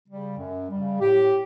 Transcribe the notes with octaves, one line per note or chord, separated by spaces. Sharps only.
C#3 G3
F#2
C#3 G3
A2 G4